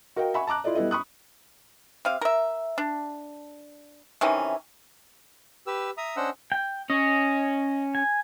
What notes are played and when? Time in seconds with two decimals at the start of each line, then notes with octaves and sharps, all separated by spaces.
0.16 F#4 A#4 D#5 F5 G5
0.34 E5 F#5 G#5 B5 C#6
0.47 A5 A#5 D6 F#6
0.64 E4 F4 A4 D5 D#5
0.75 G3 B3 E4 A4 D#5
0.91 B5 C#6 D#6 F#6
2.05 C3 F5
2.21 A#4 E5
2.78 D4
4.21 C3 D#3 E3 C#4
5.67 G4 B4 E6
5.98 E5 A#5 D#6
6.17 C#4 D4 C5 D#5 F#5 E6
6.52 G5
6.90 C#4 D#5
7.95 G#5